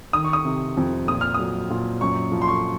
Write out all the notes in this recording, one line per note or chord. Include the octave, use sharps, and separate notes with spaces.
D#3 D#6
C#6
D#6
C3
F2
A#2 D#6
F6
F#3 D#6
A#2
F#2 C#6
F3
C6
C#6